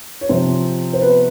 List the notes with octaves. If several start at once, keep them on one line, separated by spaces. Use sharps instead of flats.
C#5
C3 F3 C4 C5
C5
B3 B4